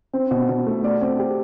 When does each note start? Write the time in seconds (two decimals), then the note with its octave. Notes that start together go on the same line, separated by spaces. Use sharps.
0.13 C4
0.31 B2
0.49 B2
0.67 A3
0.84 D5
1.01 C4
1.19 G4